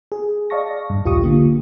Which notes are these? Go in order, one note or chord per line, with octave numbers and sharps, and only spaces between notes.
G#4
D5 D#5 F5 A5 C#6 A#6
G2
A#1 D#2 F4 G4 C#6 D#6
D3 A#3 F4